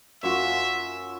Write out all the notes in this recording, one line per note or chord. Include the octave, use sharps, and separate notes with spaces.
F#2 F4 F#4 E5